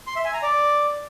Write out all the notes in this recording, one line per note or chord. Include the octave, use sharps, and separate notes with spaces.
C6
E5
G#5
A#5
D5